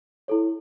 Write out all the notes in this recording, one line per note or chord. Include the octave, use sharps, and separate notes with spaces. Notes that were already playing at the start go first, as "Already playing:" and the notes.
E4 A4 C#5